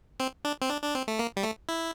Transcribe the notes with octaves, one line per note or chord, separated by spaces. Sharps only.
C4
D4
C4
D4
D4
C4
A3
A#3
G3
A3
E4